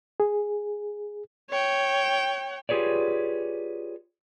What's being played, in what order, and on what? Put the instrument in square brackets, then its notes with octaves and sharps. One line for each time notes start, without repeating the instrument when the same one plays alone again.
[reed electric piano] G#4
[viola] C#5 G5
[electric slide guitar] F4 G4 G#4 B4 C#5 D5